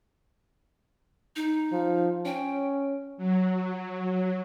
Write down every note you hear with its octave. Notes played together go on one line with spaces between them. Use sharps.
D#4
F3
C#4 G5
F#3